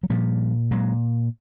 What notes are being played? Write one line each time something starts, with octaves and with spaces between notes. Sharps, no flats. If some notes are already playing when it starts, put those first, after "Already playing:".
F#3
A#2 F3 G3
A#2 F#3 G#3